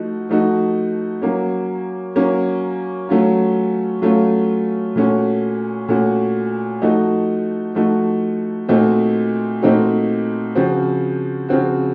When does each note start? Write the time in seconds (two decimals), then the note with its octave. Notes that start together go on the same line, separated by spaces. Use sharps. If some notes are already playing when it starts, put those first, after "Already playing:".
Already playing: F3 A3 D#4 F#4
0.29 F3 A3 D#4 F#4
1.22 F#3 A#3 C#4
2.16 F#3 A#3 C#4
3.09 F#3 A3 C#4 F4
4.02 F#3 A3 C#4 F4
4.96 A#2 A3 C#4 F#4
5.88 A#2 A3 C#4 F#4
6.82 F3 A3 D#4 F#4
7.75 F3 A3 D#4 F#4
8.68 A#2 A3 C4 D#4 F#4
9.62 A#2 A3 C4 D#4 F#4
10.55 C#3 F3 C4 F#4
11.49 C#3 F3 C4 F#4